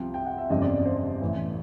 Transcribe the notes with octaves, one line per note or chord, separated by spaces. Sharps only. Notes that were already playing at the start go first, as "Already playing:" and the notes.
Already playing: C2 C3 F3 G5
G5
F#5
E5
G1 F2 C#3 E3 G3 D#5
D5
C5
A1 A2 E3